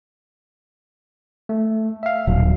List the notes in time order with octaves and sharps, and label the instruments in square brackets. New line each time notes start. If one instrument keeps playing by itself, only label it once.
[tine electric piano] A3
E5 F5
[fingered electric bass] D#1 [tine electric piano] B1 F#3